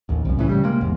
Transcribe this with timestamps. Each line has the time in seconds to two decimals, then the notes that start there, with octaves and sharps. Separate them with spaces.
0.09 A1 D#2
0.25 C2 F#2
0.38 C#2 A2 C#3 E3
0.49 C#3 G3
0.64 C3 G#3 A#3
0.81 G#1 E2